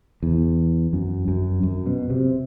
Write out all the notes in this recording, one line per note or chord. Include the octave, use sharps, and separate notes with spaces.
E2
F#2
F#2
F#2
B2
C3